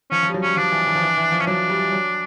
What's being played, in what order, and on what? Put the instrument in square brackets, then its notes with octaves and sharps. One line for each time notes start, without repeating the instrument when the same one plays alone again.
[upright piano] F3 [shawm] C#4
[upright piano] F3
G3
F#3
[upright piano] G3 [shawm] C#4
[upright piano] F3 [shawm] D4
[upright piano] E3
E3
F3
E3
E3
F3
[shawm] C#4
[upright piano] F#3 [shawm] D4
[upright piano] G3
F#3